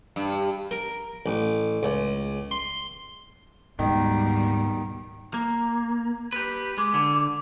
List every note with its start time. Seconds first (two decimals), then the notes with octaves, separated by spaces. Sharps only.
0.16 G2
0.71 A#4
1.26 A1
1.83 C#2
2.51 C6
3.79 D2 G#2 B2 D#3 G3
5.34 A#3
6.33 G4 B4
6.78 G#3 D6
6.94 D3